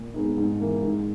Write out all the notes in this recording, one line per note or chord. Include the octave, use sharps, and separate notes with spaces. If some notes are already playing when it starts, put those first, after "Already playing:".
Already playing: A#2
G#3 B3 D#4
G#2
E3 A#3
G#2